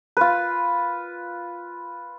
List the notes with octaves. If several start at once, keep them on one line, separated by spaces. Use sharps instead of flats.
F4 B4